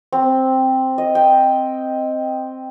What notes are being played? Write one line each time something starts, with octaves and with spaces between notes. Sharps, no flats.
C4
D#5
G5